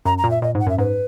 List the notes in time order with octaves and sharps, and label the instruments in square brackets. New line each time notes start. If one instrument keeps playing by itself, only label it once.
[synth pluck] F#2 [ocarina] A#5
[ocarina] A#5
[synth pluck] A#2
[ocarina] E5
[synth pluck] A#2 [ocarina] D#5
[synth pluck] G#2
[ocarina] F#5
[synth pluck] F#2 [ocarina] E5
[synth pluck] G#2 [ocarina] B4